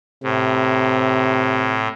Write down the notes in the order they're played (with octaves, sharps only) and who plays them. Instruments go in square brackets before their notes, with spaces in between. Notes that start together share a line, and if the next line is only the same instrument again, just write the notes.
[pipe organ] A2 [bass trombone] C3